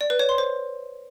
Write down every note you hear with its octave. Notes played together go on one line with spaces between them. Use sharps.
D5
B4
C#5
C6
C5